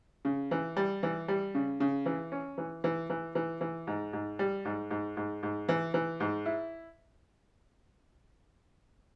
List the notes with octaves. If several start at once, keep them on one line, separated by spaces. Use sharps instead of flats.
C#3
E3
G3
E3
G3
C#3
C#3
E3
C#4
E3
E3
E3
E3
E3
G#2
G#2
G3
G#2
G#2
G#2
G#2
E3
E3
G#2
E4